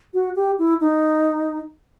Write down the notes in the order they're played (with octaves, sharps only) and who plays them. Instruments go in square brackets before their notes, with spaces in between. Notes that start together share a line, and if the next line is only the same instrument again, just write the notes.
[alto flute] F#4
G4
E4
D#4